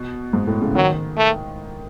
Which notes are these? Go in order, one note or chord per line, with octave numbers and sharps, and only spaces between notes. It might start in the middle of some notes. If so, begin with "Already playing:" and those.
Already playing: B2
G#2
A2
C#3
D#3 F#3
A3